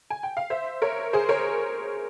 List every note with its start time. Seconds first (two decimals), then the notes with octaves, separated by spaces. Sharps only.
0.10 G#5
0.23 G5
0.37 F5
0.50 C5 E5
0.82 A#4 C#5
1.13 G#4 C5
1.29 A#4 C#5